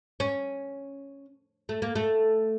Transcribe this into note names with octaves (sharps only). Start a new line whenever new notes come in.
C#4
A3
A#3
A3